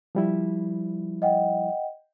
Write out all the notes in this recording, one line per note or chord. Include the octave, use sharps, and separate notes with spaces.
F3 G3 E4
D#5 F#5 G5